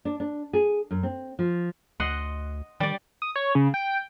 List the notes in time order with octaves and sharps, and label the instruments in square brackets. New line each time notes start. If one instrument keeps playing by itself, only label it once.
[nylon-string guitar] D4
D4
G#4
F#2
C4
F3
[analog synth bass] D2 [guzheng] D#5 F#5 C6
[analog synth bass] D#3 [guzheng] G3 D5
[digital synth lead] D#6
C#5
C#3
G5